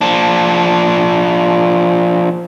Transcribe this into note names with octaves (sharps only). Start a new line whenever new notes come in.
F3 D4